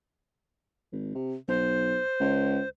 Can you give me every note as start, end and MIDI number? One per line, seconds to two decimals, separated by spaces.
0.92 1.10 32
1.15 1.35 48
1.48 1.99 35
1.48 2.69 72
2.20 2.60 37